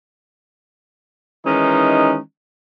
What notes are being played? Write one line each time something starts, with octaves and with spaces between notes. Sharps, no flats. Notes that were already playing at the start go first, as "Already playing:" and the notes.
D#3 E3 G#3 C#4 D#4